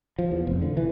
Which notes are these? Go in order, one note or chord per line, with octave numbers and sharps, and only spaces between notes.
F3
E2
F1
D3
E3